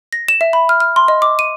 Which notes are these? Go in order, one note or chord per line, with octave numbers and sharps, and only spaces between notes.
A#6
E7
E5
B5
F6
F6
C6
D#5
D6
D#7